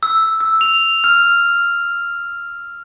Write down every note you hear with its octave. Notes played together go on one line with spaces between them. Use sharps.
E6
E6
F7
F6